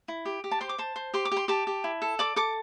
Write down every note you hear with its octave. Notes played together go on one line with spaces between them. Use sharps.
E4
G4
G4
A5
C5 C6
D6
C5 A5
C5
G4 C6
D6
G4 C6
G4 A5
G4
E4
A4
D5 D6
A4 D6